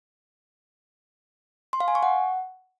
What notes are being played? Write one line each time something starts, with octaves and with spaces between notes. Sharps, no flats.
C6
F5
G#5
C#6
F#5